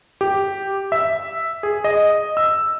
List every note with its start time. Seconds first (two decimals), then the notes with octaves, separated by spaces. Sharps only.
0.21 G4
0.92 E5
1.63 G#4
1.84 D#5
2.37 E6